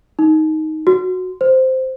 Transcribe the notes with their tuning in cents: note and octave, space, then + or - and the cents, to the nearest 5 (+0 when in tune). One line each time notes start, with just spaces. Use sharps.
D#4 +10
F#4 -10
C5 -5